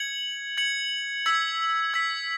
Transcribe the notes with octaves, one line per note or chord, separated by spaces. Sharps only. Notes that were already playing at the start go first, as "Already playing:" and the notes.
Already playing: G#6 C#7 F#7
G#6 C#7 F#7
E6 G#6 B6
E6 G#6 B6